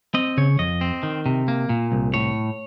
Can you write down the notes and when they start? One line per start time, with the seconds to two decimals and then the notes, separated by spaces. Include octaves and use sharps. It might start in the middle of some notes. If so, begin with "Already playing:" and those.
0.14 C4 D#5
0.37 C#3 C#5
0.59 F2 D#5
0.81 C4
1.03 D#3
1.26 C3
1.48 A#3
1.69 A#2
1.92 C2
2.14 A2 C#5